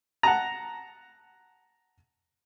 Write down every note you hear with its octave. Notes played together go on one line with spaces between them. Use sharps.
F#5 A5 A#5